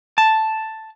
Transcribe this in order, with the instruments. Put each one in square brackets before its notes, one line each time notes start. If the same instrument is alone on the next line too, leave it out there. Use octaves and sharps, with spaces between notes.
[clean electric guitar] A5